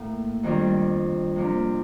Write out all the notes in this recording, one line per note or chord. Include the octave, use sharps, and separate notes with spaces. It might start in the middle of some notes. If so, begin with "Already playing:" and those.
Already playing: A2 A#3
F2 D#3 G3 D4
C3 F3 A#3 D4